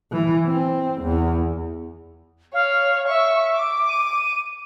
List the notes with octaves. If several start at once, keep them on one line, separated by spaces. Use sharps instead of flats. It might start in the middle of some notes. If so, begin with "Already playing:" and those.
E3
C4
E2
C#5 F5
E5 C#6
D6
D#7